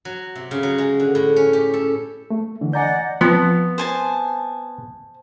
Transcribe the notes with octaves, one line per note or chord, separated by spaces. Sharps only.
F#3
C3
C#3
F#3
G#3
D3
A2
C#4
G4
A4
A3
D3 E3
D5 D#5 F#5 G#5 A#5 G6
F3 B3 C4 F4
C5 G#5 A5